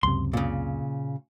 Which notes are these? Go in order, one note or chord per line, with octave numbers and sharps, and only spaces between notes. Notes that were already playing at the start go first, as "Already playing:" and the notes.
C#2 F#2 C3 C6
A#2 C#3